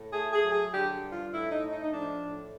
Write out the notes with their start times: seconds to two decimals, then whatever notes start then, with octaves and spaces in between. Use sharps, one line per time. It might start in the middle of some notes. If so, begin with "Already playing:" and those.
Already playing: A2
0.13 A3 G#4
0.33 G#4
0.43 F#3
0.52 G#4
0.73 D3 G4
1.02 G2
1.12 F4
1.32 A2 E4
1.51 D#4
1.61 A3
1.72 D#4
1.84 D#4
1.92 F3 D4
2.22 A2